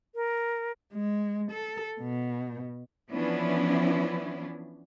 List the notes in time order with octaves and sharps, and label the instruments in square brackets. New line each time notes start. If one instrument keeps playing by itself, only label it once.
[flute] A#4
[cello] G#3
A4
B2
[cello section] E3 F3 B3 C#4 D4 E4